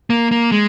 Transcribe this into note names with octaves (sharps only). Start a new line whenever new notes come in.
A#3
A#3
G#3